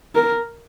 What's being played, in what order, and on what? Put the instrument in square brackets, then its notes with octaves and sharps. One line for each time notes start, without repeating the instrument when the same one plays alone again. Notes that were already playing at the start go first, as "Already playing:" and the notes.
[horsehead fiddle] A#4